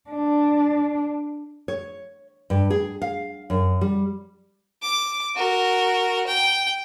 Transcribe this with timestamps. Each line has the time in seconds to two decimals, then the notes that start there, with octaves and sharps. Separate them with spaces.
0.10 D4
1.68 C#5
2.50 G2
2.70 G#4
3.02 F5
3.50 F#2
3.81 G3
4.83 D6
5.36 F#4 A#4
6.27 G5